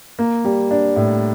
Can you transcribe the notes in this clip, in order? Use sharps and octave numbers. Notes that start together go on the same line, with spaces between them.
A#3
G3
D4
A2